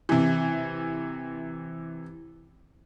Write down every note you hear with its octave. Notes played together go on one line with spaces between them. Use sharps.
C3 E3